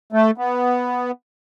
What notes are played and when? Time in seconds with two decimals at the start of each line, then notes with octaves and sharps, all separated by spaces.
0.13 A3
0.38 B3